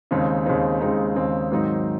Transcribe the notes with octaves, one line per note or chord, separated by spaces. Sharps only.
D#2 C#3 G#3 C4 D#4
D#2 C#3 G#3 C4 D#4
D#2 C#3 G#3 C4 D#4
D#2 C#3 G#3 C4 D#4
G#2 D#3 F#3 C4 D#4